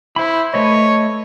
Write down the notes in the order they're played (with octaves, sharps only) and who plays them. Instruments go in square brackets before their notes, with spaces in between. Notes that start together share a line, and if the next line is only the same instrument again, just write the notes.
[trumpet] E4 [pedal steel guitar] C5 B5
[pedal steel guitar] A3 B4 D#5 [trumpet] C#5